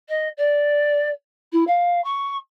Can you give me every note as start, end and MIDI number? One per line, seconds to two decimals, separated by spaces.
0.08 0.28 75
0.37 1.09 74
1.52 1.64 64
1.67 2.02 77
2.04 2.36 85